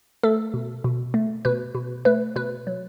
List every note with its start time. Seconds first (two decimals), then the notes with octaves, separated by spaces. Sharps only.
0.23 A3 A4
0.54 B2
0.84 B2
1.14 A3
1.45 B2 B4
1.75 B2
2.05 A3 B4
2.36 B2 B4
2.67 F#3